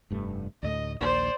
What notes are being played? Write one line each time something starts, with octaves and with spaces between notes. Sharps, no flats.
F1 G2 A3
D2 A2 A3 D#5
A#1 D#2 A#3 C5 D5